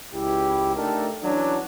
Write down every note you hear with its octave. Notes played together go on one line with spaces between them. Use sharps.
C#2 E4 G4
A3 D4 D#4 G4 A4 A#4
E3 F#3 C#4 D4